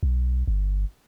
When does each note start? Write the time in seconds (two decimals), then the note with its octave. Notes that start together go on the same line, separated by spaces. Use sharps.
0.03 B1
0.47 G1